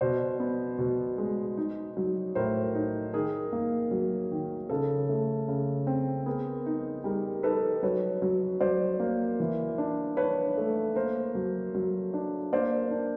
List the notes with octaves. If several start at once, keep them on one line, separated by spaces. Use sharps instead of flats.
B2 C5 D5
B3
B2
G#3
D#4
F#3
A2 A#4 C5
D#4
D#3 G#4 A#4
A#3
F#3
D#3
C#3 A4
A3
C#3
C4
B3 G#4 A#4
D#4
G3 G#4 A#4
D#4 A4 B4
F#3 B4 C#5
F#3
F#3 C5 D5
A#3
E3
D4
D4 B4 C#5
A3
A#3 A#4 C5
F#3
F#3
D4
A#3 C5 D5
D4